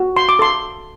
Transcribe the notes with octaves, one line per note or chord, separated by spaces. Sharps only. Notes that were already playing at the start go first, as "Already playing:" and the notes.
Already playing: F#4
C6
D6
A4 C6